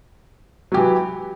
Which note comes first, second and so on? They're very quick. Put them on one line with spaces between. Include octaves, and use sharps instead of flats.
F#3 G4 E3